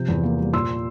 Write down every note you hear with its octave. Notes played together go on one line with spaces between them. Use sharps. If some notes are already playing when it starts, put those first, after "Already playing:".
Already playing: C3 F3 G6
E2
A#3
G3
A#2 C6 E6